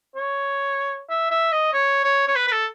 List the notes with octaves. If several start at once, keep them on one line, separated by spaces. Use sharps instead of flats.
C#5
E5
E5
D#5
C#5
C#5
C#5
B4
B4
A4